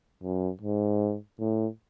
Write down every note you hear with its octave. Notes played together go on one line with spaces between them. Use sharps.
F#2
G#2
A2